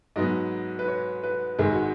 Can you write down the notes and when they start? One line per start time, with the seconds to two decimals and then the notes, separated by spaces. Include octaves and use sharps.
0.16 G#2 F#3 B3 D#5
0.79 B4
0.88 C#5
1.23 B4
1.59 G#1 G#2 D#3 G#4
1.72 F#4